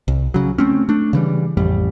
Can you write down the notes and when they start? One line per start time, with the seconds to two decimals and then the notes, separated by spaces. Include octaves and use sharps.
0.08 C2
0.34 C#3 F#3
0.58 A3 C4 C#4
0.89 A3 D4
1.13 C#3 E3 G3
1.57 A1 F2 G3